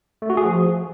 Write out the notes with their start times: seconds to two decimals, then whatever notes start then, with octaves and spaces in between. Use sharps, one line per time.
0.22 A3
0.30 F#4
0.37 G#4
0.45 F3